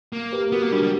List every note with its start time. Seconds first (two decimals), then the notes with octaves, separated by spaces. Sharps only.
0.13 A#3
0.33 G4 B4
0.52 B3 F#4 A#4
0.62 A#3
0.72 G3 D4 F#4
0.83 G3